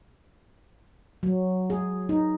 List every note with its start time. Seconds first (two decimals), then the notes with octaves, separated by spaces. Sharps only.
1.23 F#3
1.70 G#4
2.09 D#4